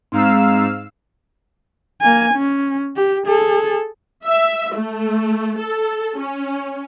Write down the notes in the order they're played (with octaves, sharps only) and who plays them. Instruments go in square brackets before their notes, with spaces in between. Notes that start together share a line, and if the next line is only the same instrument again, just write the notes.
[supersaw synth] G#2 F5 E6 [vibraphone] C4 A#5
[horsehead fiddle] A#3 G#5
C#4
G4
G#4 A4
[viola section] E5
A3
A4
C#4